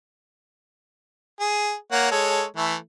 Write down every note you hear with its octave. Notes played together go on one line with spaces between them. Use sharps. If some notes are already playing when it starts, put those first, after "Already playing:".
G#4
A#3 C#5 F#5
G#3 A4 C#5
E3 A3